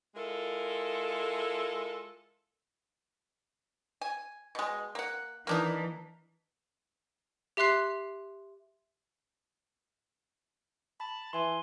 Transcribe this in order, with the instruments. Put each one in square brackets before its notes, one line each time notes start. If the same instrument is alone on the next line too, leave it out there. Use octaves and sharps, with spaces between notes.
[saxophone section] G#3 E4 F4 A4 A#4
[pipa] G#5
B2 G#3
A#3 F#5
[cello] E3 [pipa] A#3 D4 D#4
[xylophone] G4 E5 C6 F#6 C7
[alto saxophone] A5 [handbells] B5
[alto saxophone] E3 [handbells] G#5 C6